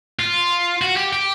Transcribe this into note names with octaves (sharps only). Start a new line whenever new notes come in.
F4
F#4
G4
G4